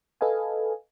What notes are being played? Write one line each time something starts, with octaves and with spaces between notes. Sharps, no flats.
A4 B4 D#5 F5 G#5